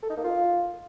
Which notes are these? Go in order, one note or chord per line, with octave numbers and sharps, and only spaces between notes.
A4
D#4
A#3
F4